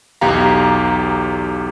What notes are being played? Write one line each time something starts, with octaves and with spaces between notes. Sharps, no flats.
B1 E2 G4 F5 A#5